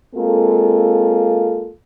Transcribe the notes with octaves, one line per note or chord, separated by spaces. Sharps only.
G#3 A#3 C4 F4 A4